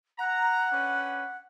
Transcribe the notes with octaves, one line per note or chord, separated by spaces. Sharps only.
F#5 A#5
C#4 D4 B4